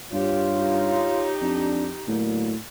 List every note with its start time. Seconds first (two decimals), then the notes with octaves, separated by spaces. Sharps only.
0.13 G2 F4 G4 C#5
0.57 D#4 G4
1.41 F2 D4
2.08 A2 D3 F#3 A#3